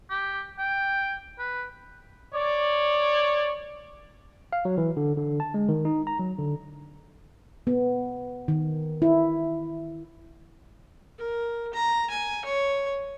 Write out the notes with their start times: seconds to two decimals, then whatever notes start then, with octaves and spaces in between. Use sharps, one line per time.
0.10 G4
0.59 G5
1.39 B4
2.34 C#5 D5
4.53 F5
4.65 F#3
4.78 E3
4.97 D3
5.17 D3
5.40 A5
5.54 G#3
5.69 D#3
5.85 D#4
6.07 A#5
6.20 F#3
6.38 D3
7.67 B3
8.48 D#3
9.02 E4
11.18 A#4
11.74 A#5
12.10 G#5
12.45 C#5